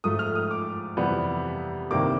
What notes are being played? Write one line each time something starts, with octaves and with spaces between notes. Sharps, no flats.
G#2 F3 A3 D#6
F6
D#6
D6
F2 C3 E3 G3 B3
C2 C3 D#3 G3 A#3 D6